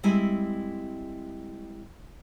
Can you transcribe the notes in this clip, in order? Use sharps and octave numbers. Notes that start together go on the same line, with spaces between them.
G3 G#3 C4 E4 G#5